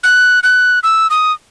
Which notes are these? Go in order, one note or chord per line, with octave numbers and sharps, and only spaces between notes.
F#6
F#6
E6
D#6